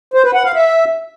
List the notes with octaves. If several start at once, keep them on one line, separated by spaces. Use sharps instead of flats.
C5
B4
F#5
F5
E5